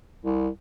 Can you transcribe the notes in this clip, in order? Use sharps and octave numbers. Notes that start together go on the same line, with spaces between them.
C2